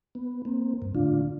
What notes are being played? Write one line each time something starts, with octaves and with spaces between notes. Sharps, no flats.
B3
A#3 C4
G2
A2 D3 D4 F4